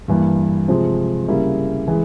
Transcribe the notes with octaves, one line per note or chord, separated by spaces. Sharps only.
G2 E3 A#3
C3 F3 G#3 C4 F4
C#3 G3 A#3 E4 A#4
E3 G#3